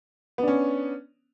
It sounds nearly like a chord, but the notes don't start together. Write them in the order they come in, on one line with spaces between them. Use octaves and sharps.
B3 D4 C#4